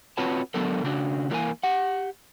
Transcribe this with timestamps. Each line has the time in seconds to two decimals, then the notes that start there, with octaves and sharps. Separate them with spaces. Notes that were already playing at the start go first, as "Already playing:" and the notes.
0.17 C4 F4 F#4 B4 C#5 A5
0.54 D3 F#3 B3 D4 A4 A#4
0.84 C#3 D4 F#4
1.30 E3 G3 A#3 A#4 G#5
1.63 G4 F#5